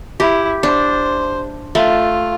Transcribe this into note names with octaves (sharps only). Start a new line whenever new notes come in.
E4 G4
D4 C5
A3 F4